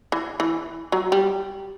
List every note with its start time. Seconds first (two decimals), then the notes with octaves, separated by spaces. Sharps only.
0.12 E3
0.40 E3
0.92 F#3
1.12 G3